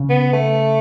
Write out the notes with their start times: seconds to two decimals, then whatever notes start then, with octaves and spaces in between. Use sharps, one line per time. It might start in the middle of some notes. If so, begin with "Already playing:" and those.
Already playing: C#3
0.10 B3
0.33 A3